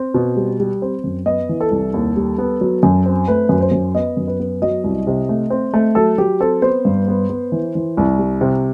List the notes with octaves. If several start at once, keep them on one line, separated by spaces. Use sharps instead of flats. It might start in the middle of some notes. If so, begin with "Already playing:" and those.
Already playing: C4
B2
G3
G3
C4
F#2
B3 D#5
E3
A4
C2
D#2
G3
B3
F#3
F#2
C4
A3 B4
F#2
C5
F#2
B3 D#5
F#2
B4
B3
F#3 D#5
C2
C3
A3
C4
A3
F#3 A4
F#3 G4
C4 A4
B3 C5
G2
B3
B3
E3
E3
C2
G3
C3